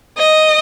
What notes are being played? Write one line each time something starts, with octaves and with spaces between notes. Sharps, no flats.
D#5